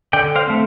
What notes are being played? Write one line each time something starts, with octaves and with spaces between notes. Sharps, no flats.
D3 D5 G5
C5 F5
A3 C4